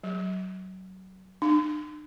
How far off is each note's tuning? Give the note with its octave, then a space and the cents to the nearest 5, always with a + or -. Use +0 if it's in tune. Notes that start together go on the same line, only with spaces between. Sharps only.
F#3 +20
D4 +45